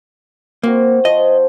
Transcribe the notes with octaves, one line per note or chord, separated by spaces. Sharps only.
A#3 C4 F#4 C#6
F3 D#5